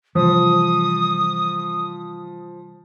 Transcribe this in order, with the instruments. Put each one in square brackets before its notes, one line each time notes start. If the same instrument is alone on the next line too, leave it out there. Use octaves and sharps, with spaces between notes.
[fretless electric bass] C3 E3 G3 [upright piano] F3 [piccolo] D#6